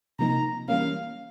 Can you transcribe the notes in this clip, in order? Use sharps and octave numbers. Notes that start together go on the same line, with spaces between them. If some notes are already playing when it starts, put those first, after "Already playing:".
C3 F3 A#3 D#4 A#5
E3 G3 A#3 C#4 F5